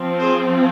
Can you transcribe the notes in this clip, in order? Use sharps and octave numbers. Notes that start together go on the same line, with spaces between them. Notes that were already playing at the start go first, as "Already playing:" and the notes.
Already playing: F3 C4
G#4 C5